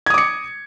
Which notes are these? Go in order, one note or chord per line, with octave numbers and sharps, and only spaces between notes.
D6 D#6 G#6 C#7